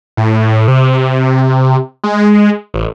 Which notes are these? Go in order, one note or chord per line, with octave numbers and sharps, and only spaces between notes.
A2
C3
G#3
A1